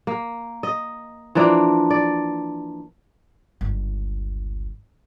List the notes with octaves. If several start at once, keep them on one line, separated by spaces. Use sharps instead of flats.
A#3
D#5
E3 F3 A#3 D4
D5
G1 C#2